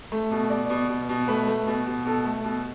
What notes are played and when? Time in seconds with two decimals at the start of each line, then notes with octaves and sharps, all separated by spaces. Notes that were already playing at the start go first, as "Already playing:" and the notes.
0.12 A3
0.31 B2
0.50 B2 D5
0.70 B2
0.89 B2
1.09 B2
1.28 A3 B4
1.47 A3
1.67 B2
1.87 B2
2.06 B2 A4
2.25 A3
2.44 B2